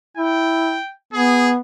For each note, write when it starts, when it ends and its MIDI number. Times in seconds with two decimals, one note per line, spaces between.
0.17 0.77 64
0.17 0.92 79
1.13 1.58 59
1.13 1.51 68